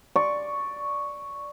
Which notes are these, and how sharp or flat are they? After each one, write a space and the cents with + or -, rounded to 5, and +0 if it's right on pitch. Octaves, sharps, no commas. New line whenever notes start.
D5 +0 C#6 +0